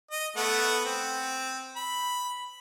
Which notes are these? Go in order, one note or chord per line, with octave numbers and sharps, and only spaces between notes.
D#5
A3 B3 F#5
C4
B5